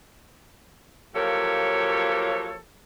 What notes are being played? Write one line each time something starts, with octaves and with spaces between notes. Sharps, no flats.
F3 F#3 A#3 G4 A4 C#5